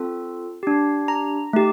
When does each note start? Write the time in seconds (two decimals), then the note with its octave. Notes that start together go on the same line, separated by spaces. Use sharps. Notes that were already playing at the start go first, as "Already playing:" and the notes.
Already playing: C4 F4 A4
0.63 D4 G4
1.08 A#5
1.53 A3 D#4 G4